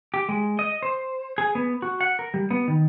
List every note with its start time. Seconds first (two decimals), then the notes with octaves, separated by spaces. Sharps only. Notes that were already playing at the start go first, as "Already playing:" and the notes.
0.14 G4
0.29 G#3
0.59 D#5
0.83 C5
1.38 G#4
1.55 B3
1.82 F#4
2.01 F#5
2.19 A#4
2.34 G3
2.51 B3
2.68 D#3